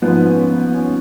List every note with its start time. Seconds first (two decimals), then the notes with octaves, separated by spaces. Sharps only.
0.02 G#2 F3 B3 B4
0.26 C#4
0.50 B3
0.74 C#4